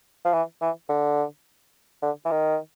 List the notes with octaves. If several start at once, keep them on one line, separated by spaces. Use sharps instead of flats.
F3
E3
E3
D3
D3
E3
D#3